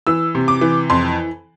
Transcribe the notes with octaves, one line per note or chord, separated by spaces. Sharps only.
E3 E6
C3
D6
E3
F2 C6